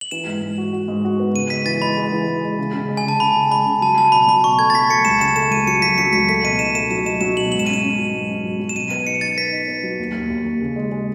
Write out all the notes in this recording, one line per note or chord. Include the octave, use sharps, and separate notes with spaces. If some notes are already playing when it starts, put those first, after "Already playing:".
F#7
E3 E7
G#2
G#2
F#4
F#4
G#2
F#4
B3
C#3 D#7
G#3 B6
E3 A6
G#3 B5
G#3
E3
G#3
G#3
C#3
C#3
G#3
G#5
C#3 A5
C#3 B5
C#3
G#3 B5
C#3
F#3 A5
F#3 A5
B2 B5
F#3 B5
B2 C#6
A3 G#6
A6
F#3 B6
A3 C#7
C#2 E7
C#3 E7
A3 E7
C#2 D#7
F#3 C#7
F#3 B6
F#3 C#7
C#2 B6
A3 B6
B2 D#7
D#4 E7
A3 E7
F#3 E7
D#4 E7
F#3 E7
B2 F#7
G#2 F#7
E7
C#4 D#7
E7
C#4
F#3
G#2
C#4
F#3
F#3
E7
B2 D#7
B3 D#7
D#4 C#7
D#4 A6
B3 B6
D#4
B3
F#3
D#2
D#2
D#2
D#2
C#3
G#3
G#3